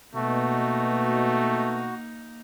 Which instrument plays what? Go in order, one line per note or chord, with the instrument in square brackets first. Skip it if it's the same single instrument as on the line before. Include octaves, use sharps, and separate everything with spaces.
[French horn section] B2 [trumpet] A3 [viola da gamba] A#3 D#4 [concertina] F#4